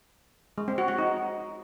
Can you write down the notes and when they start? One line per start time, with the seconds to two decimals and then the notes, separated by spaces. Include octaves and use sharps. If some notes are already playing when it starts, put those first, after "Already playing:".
0.58 G#3
0.68 C4
0.78 F#4
0.88 F#4
0.98 D#4